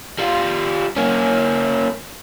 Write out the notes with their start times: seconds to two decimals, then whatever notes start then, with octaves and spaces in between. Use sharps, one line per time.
0.19 G3 F4
0.97 A#3 C#4